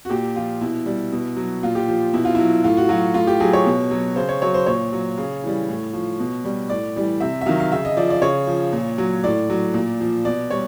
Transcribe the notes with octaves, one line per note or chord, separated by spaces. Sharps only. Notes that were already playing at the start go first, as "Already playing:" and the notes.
F#4
A#2 G4
F3 F4
B2 E4
G3
B2
F#3
A#2 F4
G4
F3
B2 E4
F4
F#3 E4
A2 F4
F#4
F#3 F4
A2 F4
G4
F#3 G#4
C#5
B2
F#3
C#3 C5
C#5
F#3 C#5
C5
A#2 C#5
F#3
C#3
E3 G3
A2
F3
B2
G3
A2 D5
E3 G3
C3 E5
E5
D#3 F#3 F5
F5
C#3 E5
D#5
F3 D5
D5
C#3 C#5
F3
A#2
F#3
A2 D5
F#3
A#2
F3
B2 D5
G3 C#5